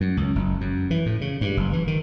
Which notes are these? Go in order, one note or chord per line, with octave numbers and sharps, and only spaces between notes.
F#2
C#2
F#1
F#2
E3
A2
C#3
G2
F#1
E3
D#3